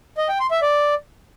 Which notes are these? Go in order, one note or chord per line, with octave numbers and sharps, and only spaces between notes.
D#5
G5
C6
E5
D5